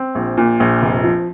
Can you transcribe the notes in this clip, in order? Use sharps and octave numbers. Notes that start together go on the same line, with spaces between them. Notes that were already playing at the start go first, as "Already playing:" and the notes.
Already playing: C4
A#1
A#2
A#1
F1
F3